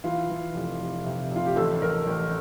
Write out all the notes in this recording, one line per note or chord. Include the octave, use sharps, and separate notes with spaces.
E3 F4
E3
F1
F1
C3
F1 F4
G4
A1 A4
A1 A#4
A1